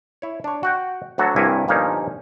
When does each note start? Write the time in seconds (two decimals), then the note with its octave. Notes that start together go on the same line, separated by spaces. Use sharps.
0.22 E4 C#5
0.44 D4 C#5
0.63 F#4 F#5 G5
1.18 D2 D3 F#3 F#4 A4
1.36 C2 G2 A#3 E4 C#5 G#5
1.68 G1 A#2 F3 A#3 C#4 D#4